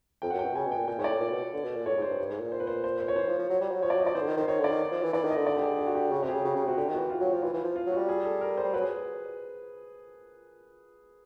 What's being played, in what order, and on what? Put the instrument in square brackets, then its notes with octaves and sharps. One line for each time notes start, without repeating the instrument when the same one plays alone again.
[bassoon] F2 [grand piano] G5
[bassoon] F#2 [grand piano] F#5
[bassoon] B2 [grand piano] G5
[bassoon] C#3 [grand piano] G#5
[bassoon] B2
[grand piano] G5
[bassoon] A#2
[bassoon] A#2 [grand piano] G5
[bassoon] G#2 [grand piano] C#5
[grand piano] D5
[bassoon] A2
A#2
B2
D3
B2
A#2
[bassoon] A2 [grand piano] C#5
[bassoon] G#2
[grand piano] C5
[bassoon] G2
G2
G#2
A#2
[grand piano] C5
B4
C5
C5
C5
C#5
[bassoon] E3 [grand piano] C5
[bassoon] F3
F3
F#3
G3
F#3
[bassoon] F3 [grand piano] C#5
[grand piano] D5
[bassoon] F#3
[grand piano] D#5
[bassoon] F3 [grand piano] D5
[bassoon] E3 [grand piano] C5
[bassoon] D3
D#3
D#3
[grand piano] C5
[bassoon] D#3 [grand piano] C#5
[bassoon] D3
[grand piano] D5
[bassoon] D#3
F3
E3
[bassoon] E3 [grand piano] D5
[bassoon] D#3
[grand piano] D#5
[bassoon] D3
[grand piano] D5
G4
G#4
G4
F#4
G4
[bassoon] C#3 [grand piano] F#4
[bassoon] C3 [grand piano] G4
[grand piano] G#4
[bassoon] C#3
[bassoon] C#3 [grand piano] F#4
[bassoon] C#3
[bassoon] C3 [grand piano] F#4
[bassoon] D3 [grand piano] G4
[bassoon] D#3
[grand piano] F#4
[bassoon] E3
[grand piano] F4
[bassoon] F#3 [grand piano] F4
[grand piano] F#4
[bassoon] F3
[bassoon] E3 [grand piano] F4
[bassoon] E3
F3
[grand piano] F4
[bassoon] F#3
[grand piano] F#4
[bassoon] G3
[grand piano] G#4
A4
A#4
C5
[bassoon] G3
[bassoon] F#3 [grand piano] B4
[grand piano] G#4